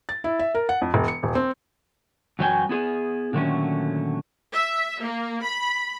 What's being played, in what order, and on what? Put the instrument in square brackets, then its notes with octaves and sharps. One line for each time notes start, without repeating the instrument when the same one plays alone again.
[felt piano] A6
E4
E5
A#4
F#5
F2
E1
C#7
D#1
C4
[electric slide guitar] F#2 E3 F#3 C#5 G5 G#5
B3 E4 G#4
A#2 D3 D#3 F#3 A3 C#4
[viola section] E5
A#3
B5